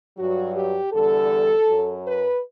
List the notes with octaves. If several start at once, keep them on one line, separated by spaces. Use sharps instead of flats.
G2 F#3 F#4
G4
E2 D3 G3 A4
F#2 F#3
B4